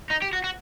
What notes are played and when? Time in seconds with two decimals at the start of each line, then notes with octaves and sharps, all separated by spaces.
0.10 D#4
0.22 G4
0.33 F#4
0.44 F#4